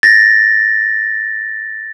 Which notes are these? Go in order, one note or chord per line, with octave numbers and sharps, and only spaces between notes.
A6 A#6